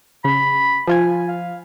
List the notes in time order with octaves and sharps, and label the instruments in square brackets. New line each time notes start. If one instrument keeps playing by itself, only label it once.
[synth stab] C#3 [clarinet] B5
[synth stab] F3 F4 G#5
[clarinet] F5